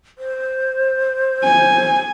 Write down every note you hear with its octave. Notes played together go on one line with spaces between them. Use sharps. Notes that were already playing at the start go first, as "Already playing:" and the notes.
C5
G#5